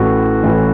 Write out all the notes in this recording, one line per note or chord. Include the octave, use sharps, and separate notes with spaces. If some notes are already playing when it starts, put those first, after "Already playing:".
Already playing: A1 A2 E3 F#4
A1 A2 E3